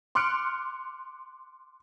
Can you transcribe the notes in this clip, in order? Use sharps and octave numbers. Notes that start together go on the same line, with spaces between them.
C6 D6 F6 F#6 C#7 D7